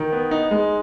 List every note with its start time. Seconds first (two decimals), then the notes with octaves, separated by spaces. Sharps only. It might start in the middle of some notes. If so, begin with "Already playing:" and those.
Already playing: D#3
0.12 B3
0.31 D#4
0.51 G#3